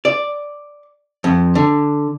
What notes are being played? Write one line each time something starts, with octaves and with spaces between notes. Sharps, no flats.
D5
F2
D3